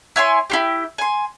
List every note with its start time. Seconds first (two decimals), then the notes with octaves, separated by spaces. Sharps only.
0.16 E4 C#5 G#5 C6
0.50 E4 F4 G4
0.98 G#5 C6